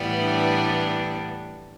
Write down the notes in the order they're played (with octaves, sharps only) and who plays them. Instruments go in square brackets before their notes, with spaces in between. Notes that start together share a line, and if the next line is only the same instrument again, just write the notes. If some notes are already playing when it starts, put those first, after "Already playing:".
Already playing: [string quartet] A2 E3 G3 B3
[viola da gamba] D4